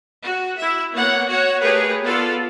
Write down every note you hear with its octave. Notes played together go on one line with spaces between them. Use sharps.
F#4
E4 E5
A#3 B3 C#5 F#5
F#4 C#5 F#5
A3 G4 G#4 A#4 B4 C#5
B3 F4 A4 D5